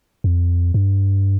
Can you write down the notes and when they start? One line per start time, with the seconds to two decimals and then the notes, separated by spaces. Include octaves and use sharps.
0.24 F2
0.74 G2